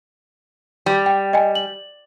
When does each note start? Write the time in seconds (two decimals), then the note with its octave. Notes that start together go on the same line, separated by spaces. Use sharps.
0.86 G3
1.06 G5
1.33 D#5 G5 G#5
1.55 F#7